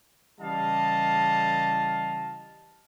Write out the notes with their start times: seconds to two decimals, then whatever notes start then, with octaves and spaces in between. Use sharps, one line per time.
0.40 C#3 E3 G3 D#5 F5 A5